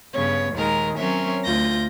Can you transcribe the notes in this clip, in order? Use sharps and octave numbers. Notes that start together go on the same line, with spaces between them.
G2 C#3 B3 C#5
D#2 A#2 D#3 G#3 A#4 A#5
F#3 C4 C#4 A#4 C#5 E5
D2 F4 G6 A#6